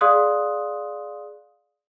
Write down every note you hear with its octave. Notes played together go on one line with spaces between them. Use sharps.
G#4 D5 F5 C6 D#6 F#6